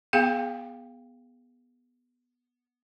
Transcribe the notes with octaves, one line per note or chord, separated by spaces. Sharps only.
B3 G#4 F5 G5